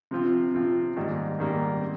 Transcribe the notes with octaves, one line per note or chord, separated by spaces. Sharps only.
C3 F3 C4 F4
C3 F3 C4 F4
G#2 D#3 G3 A#3
G#2 D#3 G3 A#3
C4